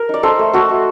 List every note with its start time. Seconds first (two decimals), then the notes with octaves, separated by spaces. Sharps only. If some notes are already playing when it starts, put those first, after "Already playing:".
Already playing: A#4
0.09 D#4 D5
0.23 D#4 A4 C5
0.39 A3
0.53 A3 F#4 A4
0.69 A3